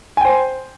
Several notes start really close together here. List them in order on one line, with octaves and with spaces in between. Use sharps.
G#5 G5 C5